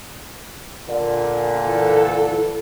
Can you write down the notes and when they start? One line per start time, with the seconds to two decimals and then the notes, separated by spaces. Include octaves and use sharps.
0.89 A#2 D3
1.66 E3 A4